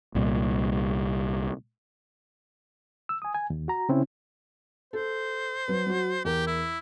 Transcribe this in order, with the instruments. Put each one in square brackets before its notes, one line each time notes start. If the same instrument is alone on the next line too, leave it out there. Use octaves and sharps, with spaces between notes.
[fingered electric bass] C2 A#2 G3
[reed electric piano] E6
G#5 D#6
G#5
D#2
F#4 A#5
C#3 C4 C#4 E4
[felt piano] A4 [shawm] C5
[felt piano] F#3 B4
F#3 F#4
[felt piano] E2 A#4 [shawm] G4
[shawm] E4